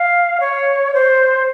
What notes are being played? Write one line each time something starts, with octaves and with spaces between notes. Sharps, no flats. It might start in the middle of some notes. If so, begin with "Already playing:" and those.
Already playing: F5
C#5
C5